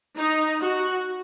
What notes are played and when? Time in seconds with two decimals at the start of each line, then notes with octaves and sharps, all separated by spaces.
0.18 D#4
0.62 F#4